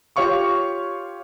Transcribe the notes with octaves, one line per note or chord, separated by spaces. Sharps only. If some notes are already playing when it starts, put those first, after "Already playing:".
F4 G4 C#5 F5 C#6 D6